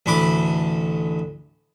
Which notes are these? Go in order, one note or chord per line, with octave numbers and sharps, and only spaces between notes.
A1 D2 D4 B5 D6